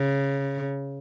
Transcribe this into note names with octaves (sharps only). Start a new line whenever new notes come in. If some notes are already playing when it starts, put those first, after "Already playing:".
Already playing: C#3